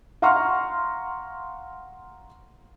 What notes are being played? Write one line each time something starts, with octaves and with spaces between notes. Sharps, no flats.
F5 F#5 A#5 C6 C#6 F6